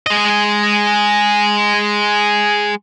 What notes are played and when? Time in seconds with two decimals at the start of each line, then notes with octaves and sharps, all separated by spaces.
0.07 G#3 D#5